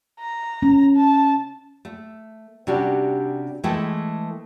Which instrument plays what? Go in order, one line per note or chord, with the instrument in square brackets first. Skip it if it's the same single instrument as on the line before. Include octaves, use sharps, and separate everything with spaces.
[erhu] A#5
[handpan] C#4
[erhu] A5
[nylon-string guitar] A3
C3 G3 C#4 D4 F#4 G4
E3 G#3 A3 E4 A4 G5